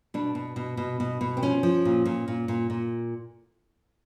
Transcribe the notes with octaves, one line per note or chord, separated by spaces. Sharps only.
B2 D4
B2
B2
B2
B2
B2
C4
F3 C#4
F3
A#2
A#2
A#2
A#2
A#2